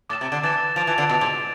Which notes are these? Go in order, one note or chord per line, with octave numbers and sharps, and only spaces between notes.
A2 D6 A6 E7
C3
D3
E3 D6 A6 E7
F3 A6 D7 F7
E3
D3
B2 A6 D7 F7
G#2